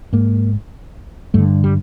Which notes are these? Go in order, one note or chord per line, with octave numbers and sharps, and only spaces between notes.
G#2 A#3
G2 D3 A3
G3